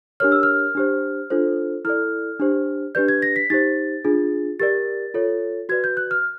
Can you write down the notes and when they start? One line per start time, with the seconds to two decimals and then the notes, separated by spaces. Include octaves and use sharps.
0.20 D4 G4 A#4 C#5 F6
0.32 E6
0.43 F6
0.75 D4 G4 C5
1.30 D4 F4 A4 C5
1.85 E4 A4 D5 F6
2.40 D4 G4 C5
2.95 D4 G4 B4 D5 G6
3.08 G#6
3.22 A#6
3.36 B6
3.50 D#4 G4 C5 A6
4.05 D4 F4 G#4
4.60 G4 A#4 D5 A6
5.14 F4 A4 C#5
5.69 F#4 B4 D5 G#6
5.84 G6
5.97 F#6
6.11 F6